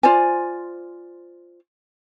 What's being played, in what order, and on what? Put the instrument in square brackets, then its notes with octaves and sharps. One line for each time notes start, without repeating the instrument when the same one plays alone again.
[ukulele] F4 C5 D5 G#5